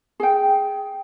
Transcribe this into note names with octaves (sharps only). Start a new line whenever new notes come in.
G#4 G5